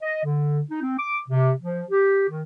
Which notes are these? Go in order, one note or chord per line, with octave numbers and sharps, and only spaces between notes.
D#5
D3
D#4
C4
D6
C3
F3
G4
D#3